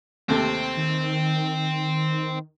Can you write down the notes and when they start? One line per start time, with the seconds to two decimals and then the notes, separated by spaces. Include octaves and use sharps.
0.29 D#2 C3 A3 C4
0.77 D#3